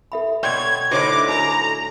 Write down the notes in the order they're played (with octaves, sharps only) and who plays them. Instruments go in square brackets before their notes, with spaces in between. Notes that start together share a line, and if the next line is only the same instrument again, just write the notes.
[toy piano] A4 E5 B5
[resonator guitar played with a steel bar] B2 C#5 [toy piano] D5 G5 C6 [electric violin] G#6
[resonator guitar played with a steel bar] A2 D3 D#4 [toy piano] F#4 C5 C#5 [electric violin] D6
[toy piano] D4 F#4 A4 [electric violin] A#5